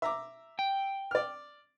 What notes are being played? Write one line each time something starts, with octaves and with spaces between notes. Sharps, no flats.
E5 A#5 D6
G5
D5 F6